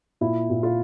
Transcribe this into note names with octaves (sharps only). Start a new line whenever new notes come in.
A#2 E4
A#2
F4